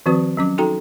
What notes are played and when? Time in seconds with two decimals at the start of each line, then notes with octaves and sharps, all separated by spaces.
0.06 D#3 F3 C4 F#4 B4
0.37 F#3 C#4 D6
0.58 D#4 F#4 A4 G5 A#5